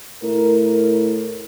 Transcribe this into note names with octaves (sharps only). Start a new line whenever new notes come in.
A2 A#4